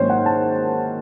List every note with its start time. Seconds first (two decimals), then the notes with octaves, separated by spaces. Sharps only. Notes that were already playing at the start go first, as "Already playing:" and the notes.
Already playing: G#2 D#3 F#3 A#3 C#4 C5 C#5
0.10 F#5
0.26 A5